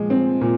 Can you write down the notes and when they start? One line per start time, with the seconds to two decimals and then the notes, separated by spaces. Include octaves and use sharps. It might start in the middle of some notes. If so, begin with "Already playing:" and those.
Already playing: A#2 F3 G#3
0.10 C4
0.41 A#2